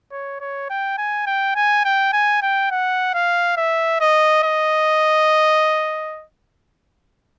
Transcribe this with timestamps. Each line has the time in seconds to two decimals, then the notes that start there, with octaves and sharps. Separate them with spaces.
0.12 C#5
0.40 C#5
0.70 G5
0.98 G#5
1.27 G5
1.56 G#5
1.85 G5
2.13 G#5
2.42 G5
2.71 F#5
3.14 F5
3.57 E5
4.00 D#5
4.44 D#5